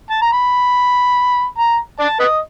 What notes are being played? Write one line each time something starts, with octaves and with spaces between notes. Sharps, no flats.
A5
A#5
B5
A#5
D5 A5
B4 D#5